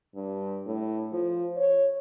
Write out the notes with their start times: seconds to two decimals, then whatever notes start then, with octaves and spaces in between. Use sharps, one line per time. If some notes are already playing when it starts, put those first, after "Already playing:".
0.15 G2
0.66 A2
1.13 F3
1.57 C#5